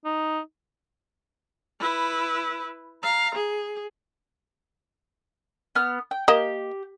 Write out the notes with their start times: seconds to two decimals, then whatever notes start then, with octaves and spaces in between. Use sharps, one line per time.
0.05 D#4
1.80 E4 B4
3.03 F5 A#5
3.35 G#4
5.75 B3 F6
6.11 G5
6.28 A#3 G4 D#5